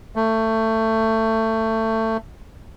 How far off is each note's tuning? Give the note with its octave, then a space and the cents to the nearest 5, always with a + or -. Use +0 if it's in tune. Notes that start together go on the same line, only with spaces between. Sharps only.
A3 +20